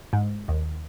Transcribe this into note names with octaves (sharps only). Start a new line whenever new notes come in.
G#2
D#2